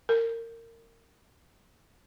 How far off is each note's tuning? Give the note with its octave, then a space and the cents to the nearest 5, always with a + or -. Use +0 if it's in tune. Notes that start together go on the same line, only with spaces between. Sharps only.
A#4 -25